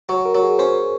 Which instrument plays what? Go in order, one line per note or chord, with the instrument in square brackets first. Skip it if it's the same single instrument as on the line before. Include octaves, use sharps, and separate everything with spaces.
[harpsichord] F#3 [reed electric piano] C#5
[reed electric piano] A#4
[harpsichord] F#3
[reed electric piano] G#4
[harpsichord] C#4 [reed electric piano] C5